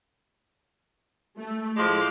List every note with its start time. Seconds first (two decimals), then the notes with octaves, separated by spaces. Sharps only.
1.38 A3
1.77 A2 F3 G#3 D6